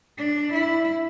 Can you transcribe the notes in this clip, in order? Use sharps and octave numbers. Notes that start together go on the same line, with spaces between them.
D4
E4